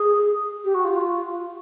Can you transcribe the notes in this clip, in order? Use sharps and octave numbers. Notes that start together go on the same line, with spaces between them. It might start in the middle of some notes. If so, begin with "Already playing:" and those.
Already playing: G#4
G4
F#4
F4